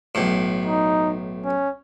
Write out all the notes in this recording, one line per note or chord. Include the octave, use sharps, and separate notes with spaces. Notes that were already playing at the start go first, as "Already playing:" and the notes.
B1 A2
D#4
C#4